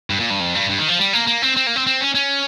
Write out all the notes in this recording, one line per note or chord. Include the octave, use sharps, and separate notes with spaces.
G2
A#2
G2
F2
G2
G2
D#3
F3
G3
A#3
A#3
C4
C4
A#3
C4
C4
C#4
C#4